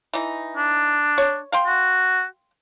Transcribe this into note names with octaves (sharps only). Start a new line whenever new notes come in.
E3 D#4
D4
C#5
F5 G5 C6
F#4